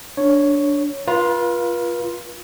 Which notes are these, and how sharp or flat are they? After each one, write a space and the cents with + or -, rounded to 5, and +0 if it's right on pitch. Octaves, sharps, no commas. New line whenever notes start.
D4 -10 C#5 +0
F4 +0 B4 -40